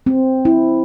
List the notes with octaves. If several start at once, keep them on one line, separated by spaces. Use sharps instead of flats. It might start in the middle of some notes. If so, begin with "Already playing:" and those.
C4
E4